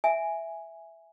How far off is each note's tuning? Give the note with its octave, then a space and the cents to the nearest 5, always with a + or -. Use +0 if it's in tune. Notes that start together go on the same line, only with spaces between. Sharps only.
E5 +0 G#5 +0